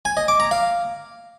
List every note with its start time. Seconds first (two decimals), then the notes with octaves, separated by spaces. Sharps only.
0.05 G#5
0.17 D#5
0.28 D6
0.40 A#5
0.51 F5